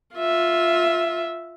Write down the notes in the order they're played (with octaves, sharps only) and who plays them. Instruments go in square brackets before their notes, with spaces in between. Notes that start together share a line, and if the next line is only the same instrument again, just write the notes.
[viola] F4 E5